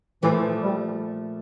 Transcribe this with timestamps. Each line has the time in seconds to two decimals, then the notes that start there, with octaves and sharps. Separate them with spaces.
0.22 A#2 E3 F3 A3
0.62 G3